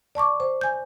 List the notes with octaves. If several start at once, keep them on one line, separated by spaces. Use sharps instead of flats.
D5 A5 C#6 D6
C5
G#5 G6